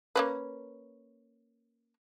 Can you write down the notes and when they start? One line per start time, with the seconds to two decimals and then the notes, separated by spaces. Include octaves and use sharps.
0.16 A#3 C#4 B4